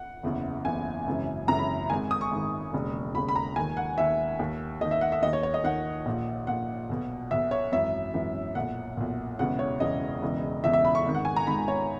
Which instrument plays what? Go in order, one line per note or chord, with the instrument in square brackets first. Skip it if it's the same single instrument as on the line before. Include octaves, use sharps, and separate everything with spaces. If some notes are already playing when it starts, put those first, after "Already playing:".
Already playing: [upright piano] F#5
F#1 E2 C#3 E3
F#1 E2 C#3 E3 G#5
G#1 F#2 C#3 E3
G#1 F#2 C#3 E3 A#5
B5
G#1 G#2 D#3 G#5
D#6
C#6
G#1 G#2 D#3
E1 D#2 C#3
E1 D#2 C#3 B5
B5
A#5
D#2 D#3 G#5
F#5
D#2 D#3 E5
D#2 D#3
D#2 D#5
D#3
E5
F#5
E5
D#2 D#3 D#5
C#5
C#5
D#5
D#2 D#3 F#5
A#1 A#2
A#1 A#2 F#5
B1 B2
B1 B2 E5
C#5
G#1 F#2 E3 E5
G#1 F#2 E3
B1 A#2 F#5
B1 A#2
E1 E2 C#3 E3 F#5
C#5
E1 E2 C#3 E3 D#5
E1 E2 C#3 E3
E1 E2 C#3 E3 E5
E5
B5
C#6
G#1 G#2 D#3
F#5
G#5
A#5
G#1 G#2 D#3 B5
C#5